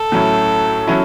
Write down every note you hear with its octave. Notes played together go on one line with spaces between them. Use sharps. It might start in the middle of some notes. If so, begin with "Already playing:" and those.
Already playing: A4
A2 F#3 C#4 E4
F#3 C#4 E4